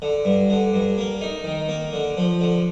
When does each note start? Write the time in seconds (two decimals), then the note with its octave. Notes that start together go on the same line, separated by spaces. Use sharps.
0.02 D3
0.25 G2
0.50 D3
0.73 G2
0.98 A#3
1.21 D#4
1.44 D#3
1.69 A#3
1.93 D3
2.17 F3
2.41 D3